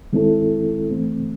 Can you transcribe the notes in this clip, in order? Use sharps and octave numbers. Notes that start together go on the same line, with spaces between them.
D#3 G#3 C4 E4 A4
E3 A3 C4